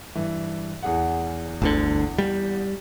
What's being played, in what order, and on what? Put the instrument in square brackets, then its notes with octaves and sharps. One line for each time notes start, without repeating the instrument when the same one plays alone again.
[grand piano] G2 E3
E2 G#4 F#5
[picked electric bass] G1 D2 D3
G3